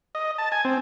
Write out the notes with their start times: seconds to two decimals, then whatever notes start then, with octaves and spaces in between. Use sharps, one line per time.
0.15 D#5
0.38 A5
0.52 G#5
0.65 C4